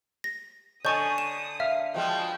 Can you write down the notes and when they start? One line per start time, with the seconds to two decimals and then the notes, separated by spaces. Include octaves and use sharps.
0.24 A#6
0.85 D3 C#5 D#5 G#5 A5 C#6 D#6 G6
1.18 E7
1.60 E5 F5
1.94 B2 F3 G#3 G5